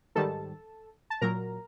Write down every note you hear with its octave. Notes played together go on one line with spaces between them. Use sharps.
G#2 D#3 G3 A4 A5
A5
A#2 F#3 A#4 A#5